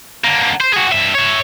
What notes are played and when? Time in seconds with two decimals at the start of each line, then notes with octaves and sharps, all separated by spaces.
0.24 D3 A#3
0.60 C5
0.73 F#4 G#4
0.92 G2 E5
1.14 C#5 E5